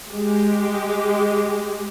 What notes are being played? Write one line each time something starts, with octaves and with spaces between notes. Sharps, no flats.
G#3 G4